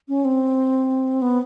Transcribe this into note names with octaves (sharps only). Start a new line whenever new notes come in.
C#4
C4
B3